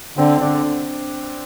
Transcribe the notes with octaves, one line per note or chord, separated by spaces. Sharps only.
D3 C4
D3 D4